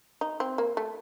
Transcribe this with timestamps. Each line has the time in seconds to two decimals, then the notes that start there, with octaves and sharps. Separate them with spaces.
0.21 D#4
0.40 C4
0.58 A#3
0.77 A3